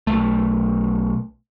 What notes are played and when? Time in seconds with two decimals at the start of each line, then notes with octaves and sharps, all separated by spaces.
0.07 B1 A3